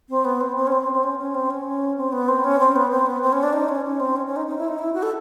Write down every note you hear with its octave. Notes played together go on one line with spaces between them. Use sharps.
C4
B3
C4
C4
C#4
C4
C4
C#4
C#4
C4
C#4
C4
B3
C4
C#4
C4
B3
C4
B3
C4
C#4
D4
D#4
C#4
C#4
C4
C#4
C#4
D#4
D#4
E4
D#4
E4
F#4
A4